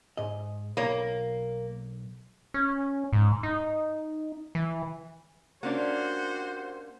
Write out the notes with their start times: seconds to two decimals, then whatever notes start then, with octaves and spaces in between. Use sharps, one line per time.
0.17 G#2 D#5
0.77 B1 A#3 C#5 A#5
2.54 C#4
3.13 G#2
3.43 D#4
4.55 E3
5.63 A#3 C#4 D4 F#4 G4 C5